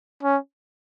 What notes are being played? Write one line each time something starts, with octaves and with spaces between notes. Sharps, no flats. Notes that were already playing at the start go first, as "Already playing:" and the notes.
C#4